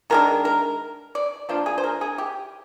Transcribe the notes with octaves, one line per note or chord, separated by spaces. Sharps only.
D#3 G#3 D4 A#4
A#4
D5
F3 A#3 D4 F4
G#4
C5
A#4
G#4
G4